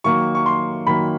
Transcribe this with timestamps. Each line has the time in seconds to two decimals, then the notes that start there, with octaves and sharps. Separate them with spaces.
0.04 D#3 F#3 A#3 C#6
0.35 C#6
0.46 C6
0.87 D#3 F#3 A#3 B5